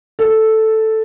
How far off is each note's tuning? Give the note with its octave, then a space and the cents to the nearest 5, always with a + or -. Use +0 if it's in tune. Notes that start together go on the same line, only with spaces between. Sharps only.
A4 +0